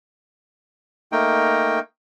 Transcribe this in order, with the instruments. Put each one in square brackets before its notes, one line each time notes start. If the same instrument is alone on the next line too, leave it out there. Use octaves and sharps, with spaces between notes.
[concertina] A3 A#3 D#4 G5